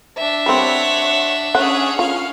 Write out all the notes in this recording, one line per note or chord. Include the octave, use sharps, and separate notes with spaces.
D4 E5
G3 C4 C#5 F#5
C#4 G#4 F#5
C#4 F4 F5